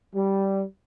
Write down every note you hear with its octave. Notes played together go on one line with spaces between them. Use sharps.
G3